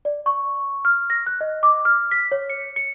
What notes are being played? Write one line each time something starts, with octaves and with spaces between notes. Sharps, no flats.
D5
C#6
F6
A#6
F#6
D#5
D6
F6
B6
C#5
C#7
C#7